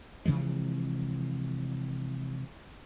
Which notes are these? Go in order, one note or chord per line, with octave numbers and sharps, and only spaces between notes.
C3 E3 F3 G#3